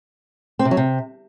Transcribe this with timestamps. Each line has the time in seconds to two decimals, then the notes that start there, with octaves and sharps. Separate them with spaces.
0.59 C4
0.65 C3
0.71 F#3
0.77 C3